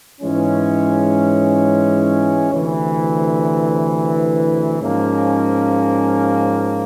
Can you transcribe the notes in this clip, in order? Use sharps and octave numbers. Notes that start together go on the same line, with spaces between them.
G#2 E3 G#3 C#4
D2 C3 E3
G#2 F3 A#3 C#4